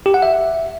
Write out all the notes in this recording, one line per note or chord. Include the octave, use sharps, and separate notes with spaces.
G4
F#5
E5